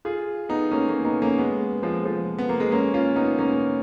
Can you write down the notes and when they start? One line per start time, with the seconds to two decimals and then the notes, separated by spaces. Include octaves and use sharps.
0.05 F4 G#4
0.49 B3 D#4
0.72 A#3 C#4
0.89 A#3 C#4
1.05 B3 D#4
1.22 A#3 C#4
1.38 G#3 B3
1.83 F3 G#3
2.05 F3
2.39 B3
2.49 A#3
2.60 G#3 B3
2.72 A#3 C#4
2.94 C#4 F4
3.16 B3 D#4
3.39 A#3 C#4